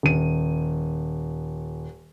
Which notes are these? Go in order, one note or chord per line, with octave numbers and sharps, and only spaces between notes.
D#1 D#7